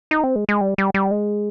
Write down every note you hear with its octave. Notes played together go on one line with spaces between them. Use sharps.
D#4
C4
G#3
G#3
G3
G3
G3
G#3